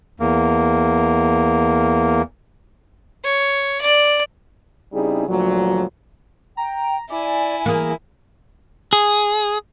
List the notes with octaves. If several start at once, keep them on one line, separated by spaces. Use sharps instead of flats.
E2 A#3
C#5
D5
C#3 G3 C4 D#4 E4 G#4
D2 A#2 F3 F#3
G5 A#5
E4 D5 G#5
E3 A#3 G#4
G#4